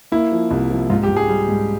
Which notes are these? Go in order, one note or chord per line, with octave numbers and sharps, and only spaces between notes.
A#3 E4
F3
C2
F3
G#2 F4
G4
G#2
G#4
G3
G#2